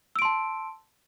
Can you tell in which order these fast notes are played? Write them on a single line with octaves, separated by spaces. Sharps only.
E6 D7 C6 A5